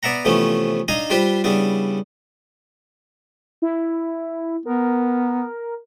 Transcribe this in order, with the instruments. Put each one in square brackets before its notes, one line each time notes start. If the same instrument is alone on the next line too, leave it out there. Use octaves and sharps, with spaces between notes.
[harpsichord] B3 D5 E5 F#5 A#5
C3 E3 F3 A3 B3 C#4
D4 D#4 D#5 F5 G#5
G3 F4 G4 B4 C5
C#3 G3 B3 D4 E4
[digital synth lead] E4
[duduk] B3 [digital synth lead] A#4